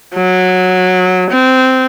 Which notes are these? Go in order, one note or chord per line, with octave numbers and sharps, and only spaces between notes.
F#3
C4